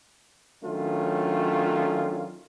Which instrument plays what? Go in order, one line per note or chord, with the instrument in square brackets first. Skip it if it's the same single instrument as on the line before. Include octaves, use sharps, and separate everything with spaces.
[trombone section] D#3 F#3 A3 C#4 D4 F4